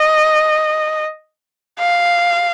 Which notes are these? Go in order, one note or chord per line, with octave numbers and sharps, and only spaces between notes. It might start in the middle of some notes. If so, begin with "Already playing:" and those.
Already playing: D#5
F5